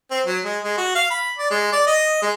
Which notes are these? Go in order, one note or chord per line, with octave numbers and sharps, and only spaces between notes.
C4
F#3
G#3
G#3
F#4
F5
B5
D5
G#3
D5
D#5
G#3